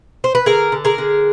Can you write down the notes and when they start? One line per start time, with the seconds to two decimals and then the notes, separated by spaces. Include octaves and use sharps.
0.24 C5
0.35 B4
0.46 D3 G#4 A#4
0.72 D3
0.85 G#4 A#4
0.98 D3